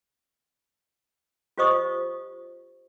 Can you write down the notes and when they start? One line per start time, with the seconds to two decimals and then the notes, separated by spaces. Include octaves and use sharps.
1.58 F4 G4 C5 D#5 C#6 D#6